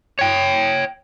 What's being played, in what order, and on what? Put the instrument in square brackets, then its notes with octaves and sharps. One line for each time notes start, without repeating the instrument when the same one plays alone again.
[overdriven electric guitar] C#5 G5